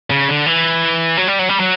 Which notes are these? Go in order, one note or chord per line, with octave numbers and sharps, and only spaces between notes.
C#3
D3
E3
F#3
G3
F#3
G3
F#3